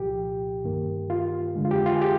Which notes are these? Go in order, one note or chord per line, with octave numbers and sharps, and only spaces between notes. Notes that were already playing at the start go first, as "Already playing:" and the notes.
Already playing: C2 A#2 F3 G4
G2 D#3 A#3
F4
F2 D3 G#3
F4
G4
F4
G#4
G4